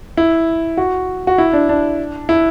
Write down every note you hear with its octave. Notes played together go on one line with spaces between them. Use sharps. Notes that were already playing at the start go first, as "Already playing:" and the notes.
E4
F#4
F#4
E4
D4
D4
E4